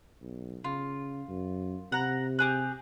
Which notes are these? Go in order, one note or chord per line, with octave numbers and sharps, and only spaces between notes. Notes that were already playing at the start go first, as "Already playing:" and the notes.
B1
C#3 F4
F#2
C3 F#5 A#5
G4 G#4 F#6